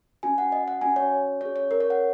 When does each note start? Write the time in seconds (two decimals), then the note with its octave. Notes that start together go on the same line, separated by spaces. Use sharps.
0.23 C#4 F#4 G#5
0.38 F#5
0.52 D#5
0.68 F#5
0.81 C#4 F#4 G#5
0.96 C#5
1.41 C#4 G#4 C#5
1.56 C#5
1.71 A#4
1.80 C#5
1.90 F#5